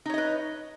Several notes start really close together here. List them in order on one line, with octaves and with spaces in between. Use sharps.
D#4 C#5 D#5 B4